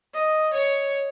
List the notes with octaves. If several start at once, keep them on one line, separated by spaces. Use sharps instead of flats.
D#5
C#5